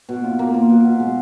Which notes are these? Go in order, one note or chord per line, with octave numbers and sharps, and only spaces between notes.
B2
F4
A#3
F4
B2
B2
G#3